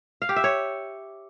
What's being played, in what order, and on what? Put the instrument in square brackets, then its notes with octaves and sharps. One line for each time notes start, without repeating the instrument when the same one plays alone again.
[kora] F5
G4
E5
C#5